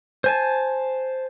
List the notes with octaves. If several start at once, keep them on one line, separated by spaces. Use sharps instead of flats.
C5 G#5 A5